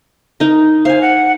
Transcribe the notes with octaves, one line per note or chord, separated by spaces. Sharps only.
D#4 A#4
C5 F5 G#5
F#5